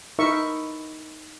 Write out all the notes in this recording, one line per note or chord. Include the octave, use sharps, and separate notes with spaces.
D#4 E4 A#4 E5 C#6